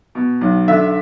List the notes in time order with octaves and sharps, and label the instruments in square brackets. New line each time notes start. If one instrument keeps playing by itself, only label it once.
[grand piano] B2
B1
D3 E5